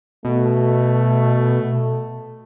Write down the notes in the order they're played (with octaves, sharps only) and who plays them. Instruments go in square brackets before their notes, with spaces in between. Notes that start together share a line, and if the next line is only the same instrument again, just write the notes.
[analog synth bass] B2 [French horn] A3